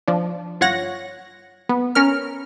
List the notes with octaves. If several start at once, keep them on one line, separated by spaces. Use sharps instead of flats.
F3 D4
G1 F4 C#5 F#5 A#6
B3
C#4 A#4 F6